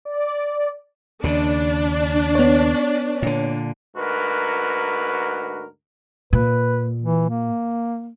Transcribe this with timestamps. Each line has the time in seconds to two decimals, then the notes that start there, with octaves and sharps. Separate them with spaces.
0.05 D5
1.24 D#2 C#3 D4
2.35 B3 C#5
3.22 A#2 D3
3.96 D2 G#2 F#4 A#4 B4
6.33 A#2 B4
7.02 E3
7.29 A#3